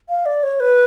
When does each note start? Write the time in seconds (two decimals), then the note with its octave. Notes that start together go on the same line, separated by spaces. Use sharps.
0.09 F5
0.26 D5
0.43 C#5
0.60 B4